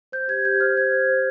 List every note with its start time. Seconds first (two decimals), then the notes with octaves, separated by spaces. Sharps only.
0.12 C5 G6
0.28 G4 G#6
0.45 G4 G6
0.60 C5 F6
0.77 C5 G#6
0.93 C5
1.09 C5